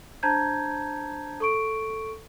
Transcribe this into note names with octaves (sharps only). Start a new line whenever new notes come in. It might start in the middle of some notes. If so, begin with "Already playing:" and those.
D4 C5 A5 A#5 G6 G#6
A4 C#6 D7